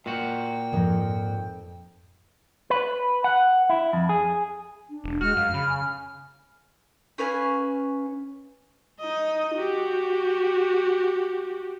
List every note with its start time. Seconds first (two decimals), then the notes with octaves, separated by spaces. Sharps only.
0.06 A#2 F#4 D#5 G5
0.73 F2 G#2 A#4 D#5
2.70 B4
3.24 F#5
3.70 E4
3.93 F2
4.09 G#4
4.90 D4
5.04 E1
5.21 G#3 F#4 F6
5.37 F#2 F5
5.54 C#3 B5
5.69 G#5
7.18 C#4 B4 F5 G#5
8.99 D#4 D#5
9.54 F#4 G4